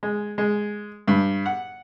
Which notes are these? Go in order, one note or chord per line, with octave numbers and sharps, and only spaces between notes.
G#3
G#3
G2
F#5